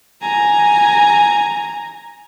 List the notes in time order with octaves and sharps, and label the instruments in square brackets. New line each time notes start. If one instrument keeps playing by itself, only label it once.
[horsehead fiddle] G#5 A#5